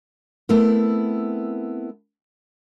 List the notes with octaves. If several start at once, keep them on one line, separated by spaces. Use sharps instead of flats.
A3 B3 C4 E4 A#4